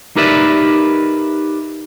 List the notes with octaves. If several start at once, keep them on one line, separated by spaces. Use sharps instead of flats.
D#4 G4 A#4 B4 D5 E5